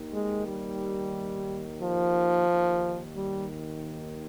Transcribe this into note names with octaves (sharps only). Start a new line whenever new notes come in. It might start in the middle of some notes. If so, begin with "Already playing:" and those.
Already playing: D#2 D#3
G#3
G3
F3
D#2 D#3
G3